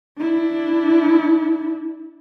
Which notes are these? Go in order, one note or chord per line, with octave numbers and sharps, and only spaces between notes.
D4 E4